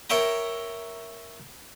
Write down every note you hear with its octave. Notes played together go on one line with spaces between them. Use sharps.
A#4 C#5 E5 G5 A#5